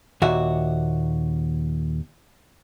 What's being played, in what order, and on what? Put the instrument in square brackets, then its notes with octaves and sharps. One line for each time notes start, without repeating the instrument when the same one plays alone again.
[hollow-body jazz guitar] D#2 A#2 F#4 E5